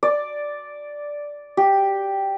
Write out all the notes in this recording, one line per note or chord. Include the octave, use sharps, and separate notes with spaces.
D5
G4